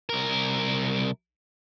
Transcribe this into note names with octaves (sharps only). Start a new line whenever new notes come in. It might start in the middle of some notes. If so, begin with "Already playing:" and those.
C2 A#4